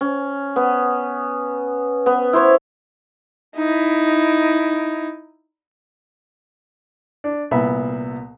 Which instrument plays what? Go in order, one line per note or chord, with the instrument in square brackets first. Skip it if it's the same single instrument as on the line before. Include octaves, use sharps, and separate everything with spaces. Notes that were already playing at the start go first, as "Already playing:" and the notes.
[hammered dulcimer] C#4
B3
B3
E4 C5 C#5
[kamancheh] D#4 E4
[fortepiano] D4
C2 A#2 B3 E5 B5